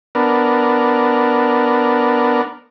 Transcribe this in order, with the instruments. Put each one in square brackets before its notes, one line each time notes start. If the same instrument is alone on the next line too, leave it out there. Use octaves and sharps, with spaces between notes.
[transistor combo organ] B3 D4 A#4